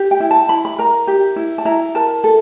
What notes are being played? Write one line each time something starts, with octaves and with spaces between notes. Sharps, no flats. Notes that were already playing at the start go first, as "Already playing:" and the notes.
Already playing: G4
G5
E4
A5
E4 B5
B5
A#4 A#5
G4
E4
A5
E4 A#5
A#4 A5
A4